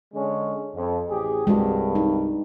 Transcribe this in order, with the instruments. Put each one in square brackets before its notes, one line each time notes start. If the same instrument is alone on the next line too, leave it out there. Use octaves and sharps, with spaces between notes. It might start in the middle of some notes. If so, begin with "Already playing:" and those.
[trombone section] D3 G#3 C#4
F2
A1 G4 G#4
[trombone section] C2 G2 [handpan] G#3 F#4
[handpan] D#4